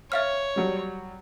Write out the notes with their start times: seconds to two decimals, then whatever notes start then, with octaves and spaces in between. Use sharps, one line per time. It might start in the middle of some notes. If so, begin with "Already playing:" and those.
0.12 C#5 E5 F5 F6
0.56 F#3 G3